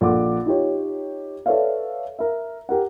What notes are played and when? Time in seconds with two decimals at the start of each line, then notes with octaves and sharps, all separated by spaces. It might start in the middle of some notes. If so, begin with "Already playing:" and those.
0.01 A#1 A4 F#5 D6
0.46 D#4 F4 G4 C#5
1.46 A4 B4 C#5 D5 E5 F5
2.19 A#4 E5
2.69 G4 A#4 F#5